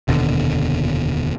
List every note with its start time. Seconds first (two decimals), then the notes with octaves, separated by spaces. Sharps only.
0.08 F1 D#2 B2 D3